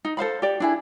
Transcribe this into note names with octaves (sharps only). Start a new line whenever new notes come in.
D#4
A4 C5 F5 B5
G4 D5
D4 E4 G#4